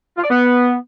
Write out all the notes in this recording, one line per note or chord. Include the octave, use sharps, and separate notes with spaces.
F4
D5
B3